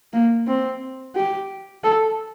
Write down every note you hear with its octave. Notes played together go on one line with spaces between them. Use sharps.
A#3
C4
G4
A4